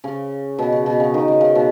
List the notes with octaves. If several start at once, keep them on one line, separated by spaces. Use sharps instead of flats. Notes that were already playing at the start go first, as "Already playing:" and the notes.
C#3
B2
C#3
B2
C#3
D#3
C#3
C#3
B2